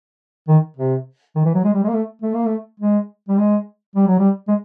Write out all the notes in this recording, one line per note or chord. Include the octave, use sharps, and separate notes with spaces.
D#3
C3
D#3
E3
F#3
G#3
G3
G#3
A#3
A3
A3
A#3
A3
G#3
G3
G#3
G3
F#3
G3
G#3